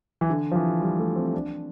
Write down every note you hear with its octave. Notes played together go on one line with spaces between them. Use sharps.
E3
D3
F3
E3
G3
A3
C4
D4